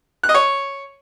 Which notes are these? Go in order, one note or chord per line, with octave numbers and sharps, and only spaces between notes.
F#6
D#5
C#5